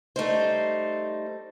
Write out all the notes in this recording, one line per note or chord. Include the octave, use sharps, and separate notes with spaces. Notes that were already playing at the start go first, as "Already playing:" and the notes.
G3 A3 D#4 C5